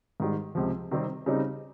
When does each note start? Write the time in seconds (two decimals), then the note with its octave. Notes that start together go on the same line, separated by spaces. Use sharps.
0.20 G#2 D#3 G3
0.55 C#2 C3 F3
0.91 C3 D#3 G3 C4
1.26 C#3 G3 C4 D#4